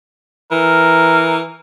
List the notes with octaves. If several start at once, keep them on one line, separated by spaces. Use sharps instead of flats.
E3 A#4